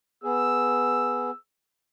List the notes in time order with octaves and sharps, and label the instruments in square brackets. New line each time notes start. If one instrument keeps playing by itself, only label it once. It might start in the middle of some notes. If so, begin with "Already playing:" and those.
[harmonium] B3 G#4 [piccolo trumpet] E6